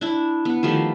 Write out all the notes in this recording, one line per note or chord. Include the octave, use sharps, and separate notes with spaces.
D4 E4
B3
D#3 F3 A3 G4